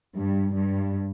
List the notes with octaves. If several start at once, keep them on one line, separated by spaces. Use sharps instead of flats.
G2
G2